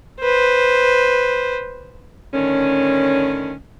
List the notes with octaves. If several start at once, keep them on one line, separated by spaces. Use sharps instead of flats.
B4 C5
A2 D3 D#3 C#4